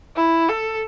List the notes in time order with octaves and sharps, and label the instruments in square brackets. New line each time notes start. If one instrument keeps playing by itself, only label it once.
[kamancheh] E4
A4